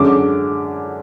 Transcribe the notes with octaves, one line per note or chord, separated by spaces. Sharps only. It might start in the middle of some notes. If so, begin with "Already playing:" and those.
Already playing: F#2 D3 G#3 C#4 D6